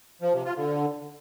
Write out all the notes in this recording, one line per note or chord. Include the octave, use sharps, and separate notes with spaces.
F3
C3
F4
D3